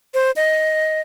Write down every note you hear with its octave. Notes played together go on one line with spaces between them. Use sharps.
C5
D#5